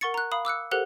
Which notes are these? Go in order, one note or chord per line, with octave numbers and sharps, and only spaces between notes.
A#4 F#5 C#6 A6 C#7
A#5 F#6
F5 B5 D#6
D6 E6 F#6 C#7
G4 A4 A#4 C5 F#5 F#6